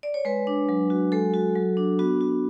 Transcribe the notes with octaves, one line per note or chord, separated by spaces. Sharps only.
D5
C#5
G#3 B4
D4
F#3
F#4
G#3 A4
F#4
F#3
D4
B3 F#4
F#4